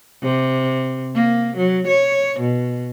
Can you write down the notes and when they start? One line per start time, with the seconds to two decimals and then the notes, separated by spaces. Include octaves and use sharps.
0.22 C3
1.15 A#3
1.57 F#3
1.87 C#5
2.40 B2